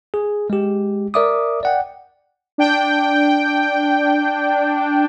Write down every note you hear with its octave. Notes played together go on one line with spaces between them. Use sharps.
G#4
G#3 G4
A#4 D5 E5 D6 D#6
D5 F#5 G5
D4 G5